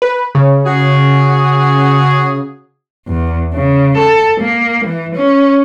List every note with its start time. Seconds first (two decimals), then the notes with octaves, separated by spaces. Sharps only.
0.02 B4
0.35 C#3
0.65 F#4 G#4
3.07 E2
3.53 C#3
3.97 A4
4.40 A#3
4.85 E3
5.15 C#4